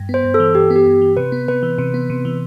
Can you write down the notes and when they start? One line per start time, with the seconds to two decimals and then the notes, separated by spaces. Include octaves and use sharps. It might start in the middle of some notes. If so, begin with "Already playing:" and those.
Already playing: G2
0.09 B3
0.14 C5
0.24 G2
0.34 A4
0.40 E3
0.55 G2 G4
0.70 B3
0.76 G4
0.87 G2
1.01 E3
1.17 C3 B4
1.32 B3
1.48 C3 B4
1.63 E3
1.78 C3
1.94 B3
2.10 C3
2.25 E3